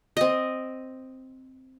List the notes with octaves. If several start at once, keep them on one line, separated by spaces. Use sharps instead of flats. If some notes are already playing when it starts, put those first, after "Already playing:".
C4 D#5